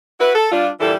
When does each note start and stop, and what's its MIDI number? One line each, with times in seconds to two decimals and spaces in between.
0.20 0.34 64
0.20 0.34 66
0.20 0.34 71
0.35 0.51 69
0.52 0.70 55
0.52 0.70 62
0.52 0.70 65
0.80 0.94 46
0.80 0.94 50
0.80 0.94 52
0.80 0.94 55
0.80 0.94 64
0.80 0.94 69